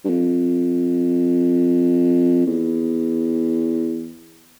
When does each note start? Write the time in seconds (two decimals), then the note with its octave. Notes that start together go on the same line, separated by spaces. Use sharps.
0.05 G2
0.10 F2
2.47 E2